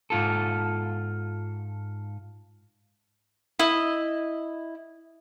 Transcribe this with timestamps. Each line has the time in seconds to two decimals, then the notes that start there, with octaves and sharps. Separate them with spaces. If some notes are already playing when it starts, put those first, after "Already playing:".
0.10 G#2 F4 A4
3.59 E4 D#5